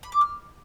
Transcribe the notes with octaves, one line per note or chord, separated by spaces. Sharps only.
B5
D6
F6